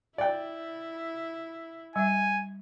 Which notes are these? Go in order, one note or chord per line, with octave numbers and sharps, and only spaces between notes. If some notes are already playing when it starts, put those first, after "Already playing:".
E4 D5 G5
G3 E5 G#5